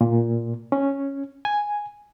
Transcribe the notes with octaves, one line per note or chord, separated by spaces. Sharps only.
A#2
C#4
G#5